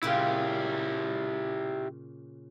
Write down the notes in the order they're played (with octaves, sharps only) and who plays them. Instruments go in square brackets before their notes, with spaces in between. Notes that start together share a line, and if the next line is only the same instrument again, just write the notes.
[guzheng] A#2 C#3 C#4 [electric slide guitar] E4 G4